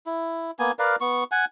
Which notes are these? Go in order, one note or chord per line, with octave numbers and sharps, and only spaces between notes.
E4
A#3 B3 G#5
A#4 B4 D5 F5
B3 C#6
F#5 G#5